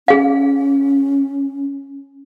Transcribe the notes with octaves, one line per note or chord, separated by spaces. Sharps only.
C#4 G#4 F5